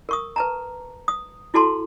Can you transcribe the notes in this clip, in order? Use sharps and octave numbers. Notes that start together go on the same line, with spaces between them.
A#4 C#6 D#6
B4 A5 A#5
D#6
E4 F#4 A4 A5 C6